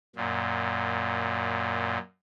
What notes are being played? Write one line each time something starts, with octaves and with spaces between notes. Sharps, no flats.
F#2 A#2